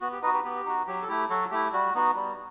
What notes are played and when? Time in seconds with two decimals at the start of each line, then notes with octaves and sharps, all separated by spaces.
0.01 B3 F#4
0.12 G4
0.22 D#4 B4 D#5
0.26 F#4
0.34 G4 B4
0.44 B3 G4
0.65 D#4 F#4
0.87 F#3 G4
1.02 A4
1.08 A3 E4 G4
1.30 F#3 F#4 A4
1.51 A3 E4 G4
1.73 G3 F#4
1.95 B3 D#4 F#4
2.16 G3